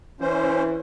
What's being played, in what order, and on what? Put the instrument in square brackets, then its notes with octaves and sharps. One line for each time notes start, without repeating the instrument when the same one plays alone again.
[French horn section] E3 [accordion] C#4 C5